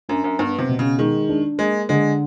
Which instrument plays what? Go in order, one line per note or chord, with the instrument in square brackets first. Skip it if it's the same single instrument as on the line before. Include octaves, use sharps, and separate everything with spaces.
[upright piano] F#2 [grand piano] D4
[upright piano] F#2
[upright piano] G2 [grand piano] B3
[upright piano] C3
[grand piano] B2
[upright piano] C#3
[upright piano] D#3 [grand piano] G#3
[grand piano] D4
[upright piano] G#3 [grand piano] A#3
[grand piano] D3 [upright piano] G#3